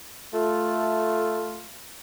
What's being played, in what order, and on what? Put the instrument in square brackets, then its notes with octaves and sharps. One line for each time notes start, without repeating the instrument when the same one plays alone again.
[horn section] A3 F4